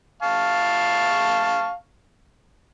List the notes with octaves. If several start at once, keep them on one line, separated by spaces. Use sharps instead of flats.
F5 A5 C#6